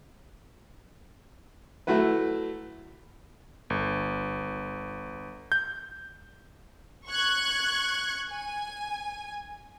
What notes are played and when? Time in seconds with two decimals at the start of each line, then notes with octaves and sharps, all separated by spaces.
1.87 F#3 A3 E4 F#4 B4
3.70 G1
5.52 G6
7.08 C#6 F#6 G#6
8.32 G#5